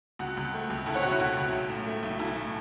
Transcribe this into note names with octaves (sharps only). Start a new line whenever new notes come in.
C#2 F#4
C#2
A3
C#2
C#2 E4 A4
C#5 F#5
B2 F#4
E4
C#2 F#4
C#2
B1
A2
A3
B1
B1 E4 A4
A2